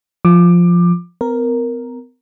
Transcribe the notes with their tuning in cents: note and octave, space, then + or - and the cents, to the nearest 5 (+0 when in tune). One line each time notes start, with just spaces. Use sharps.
F3 +0 D6 +20
B3 +45 A#4 +0